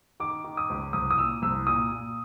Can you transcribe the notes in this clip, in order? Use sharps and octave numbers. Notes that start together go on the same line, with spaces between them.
D#3 D6
D#3
D#6
C#2
C2 D#6
D#6
A#2 E6
C2 E6
A#2 D#6
A#2